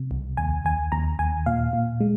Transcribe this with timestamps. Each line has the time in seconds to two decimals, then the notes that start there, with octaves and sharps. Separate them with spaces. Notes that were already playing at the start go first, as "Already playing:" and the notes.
Already playing: C3
0.11 C2
0.37 D#2 G#5
0.65 D#2 G#5
0.92 D#2 A#5
1.19 D#2 G#5
1.46 A#2 F5
1.73 A#2
2.01 G#3